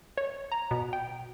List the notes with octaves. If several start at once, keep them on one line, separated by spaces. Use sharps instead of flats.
C#5
A#5
B2
G5